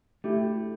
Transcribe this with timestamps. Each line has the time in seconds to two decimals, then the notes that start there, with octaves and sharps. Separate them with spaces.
0.24 A3 E4 G4